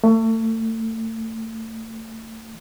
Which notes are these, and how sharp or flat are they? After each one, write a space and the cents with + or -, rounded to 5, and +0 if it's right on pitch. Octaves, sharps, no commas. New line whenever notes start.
A3 +30